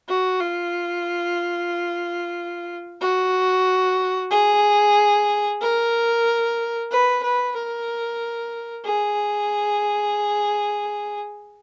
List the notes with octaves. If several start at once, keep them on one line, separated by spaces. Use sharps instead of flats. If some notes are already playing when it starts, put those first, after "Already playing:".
F#4
F4
F#4
G#4
A#4
B4
B4
A#4
G#4